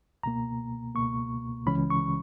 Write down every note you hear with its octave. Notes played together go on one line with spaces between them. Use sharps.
C#2 B2 A#3 A#5
C#2 B2 A#3 C#6
C#2 C#3 E3 G#3 C#4 B5
C#6